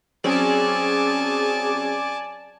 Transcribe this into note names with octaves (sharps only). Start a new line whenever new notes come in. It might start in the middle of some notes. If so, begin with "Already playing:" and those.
F#3 C4 C#4 G#4 D5 G#5 A5